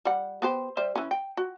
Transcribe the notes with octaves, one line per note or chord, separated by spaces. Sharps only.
G3 F#5
B3 G4 C5
G3 C5 E5
E3 C#4
G5
F#4